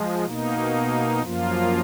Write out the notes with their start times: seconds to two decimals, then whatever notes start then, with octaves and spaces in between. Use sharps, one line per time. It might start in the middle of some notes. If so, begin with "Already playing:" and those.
Already playing: F3 G#3
0.25 B2 A#3 D#4
1.22 F#2 F3 A#3 F4